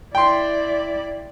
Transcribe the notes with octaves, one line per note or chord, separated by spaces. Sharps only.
E4 D5 G5 C6